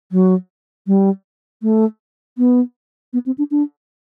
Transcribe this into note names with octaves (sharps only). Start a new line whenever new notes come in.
F#3
G3
A3
B3
B3
C4
D4
D4